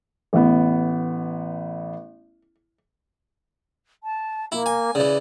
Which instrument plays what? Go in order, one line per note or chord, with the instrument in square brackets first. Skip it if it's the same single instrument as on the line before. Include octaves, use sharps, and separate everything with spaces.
[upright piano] A1 B3
[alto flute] A5
[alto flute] A#3 [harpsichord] E4
[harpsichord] G#5
[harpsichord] C#3 E3 [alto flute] D5